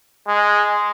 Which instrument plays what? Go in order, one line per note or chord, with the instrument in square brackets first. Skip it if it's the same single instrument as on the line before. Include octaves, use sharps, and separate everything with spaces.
[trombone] G#3